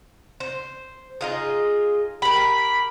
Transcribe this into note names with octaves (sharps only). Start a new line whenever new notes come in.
C5
D#4 F4 G#4
G4 A#4 B5